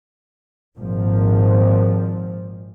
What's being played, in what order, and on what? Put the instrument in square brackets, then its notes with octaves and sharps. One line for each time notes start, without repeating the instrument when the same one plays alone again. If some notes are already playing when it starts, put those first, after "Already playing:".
[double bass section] G#1 A#2 F3